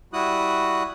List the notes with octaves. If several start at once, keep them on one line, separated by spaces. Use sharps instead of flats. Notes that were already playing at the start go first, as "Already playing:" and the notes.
G3 E4 F#4 D#6 F#6